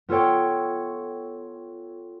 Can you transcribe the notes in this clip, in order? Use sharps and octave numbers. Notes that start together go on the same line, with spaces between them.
B3 F4 A4 C#5 G5